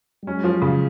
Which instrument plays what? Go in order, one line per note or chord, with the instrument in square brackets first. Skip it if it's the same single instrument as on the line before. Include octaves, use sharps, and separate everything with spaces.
[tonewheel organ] G3
[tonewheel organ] F#3 G#3 [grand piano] C#4
[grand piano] F3
C#3